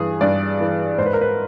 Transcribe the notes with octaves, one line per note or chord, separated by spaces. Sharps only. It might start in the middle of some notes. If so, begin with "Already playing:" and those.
Already playing: G2 E3 G#4
G2 D5
E3
G#2 C5
B4
A#4
B4